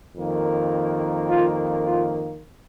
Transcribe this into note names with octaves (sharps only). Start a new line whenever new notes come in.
F2 D#3 A#3
F4
F4